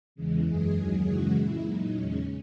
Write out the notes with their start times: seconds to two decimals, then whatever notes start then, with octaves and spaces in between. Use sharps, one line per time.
0.15 E2 C#3 E3 G#3
0.45 F#2 E3 G#3 G#4
0.75 D#2 D#3 F#3
1.03 F#2 C#3 E3 G#3 F#4
1.33 A#2 G#3 E4
1.62 A#2 F#3 D#4
1.91 E2 C#3 G#3 C#4